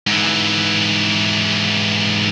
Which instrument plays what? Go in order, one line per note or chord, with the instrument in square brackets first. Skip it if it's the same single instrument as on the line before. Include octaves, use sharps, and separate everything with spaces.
[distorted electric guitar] G#2 E3